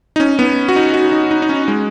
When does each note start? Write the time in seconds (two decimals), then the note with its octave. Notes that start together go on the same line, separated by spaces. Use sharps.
0.16 D#4
0.20 C#4
0.39 B3
0.68 F#4
0.76 D#4
0.94 F#4
1.12 D#4
1.31 D#4
1.42 D#4
1.49 C#4
1.68 G#3